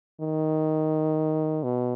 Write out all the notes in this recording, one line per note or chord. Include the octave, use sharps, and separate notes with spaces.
D#3
B2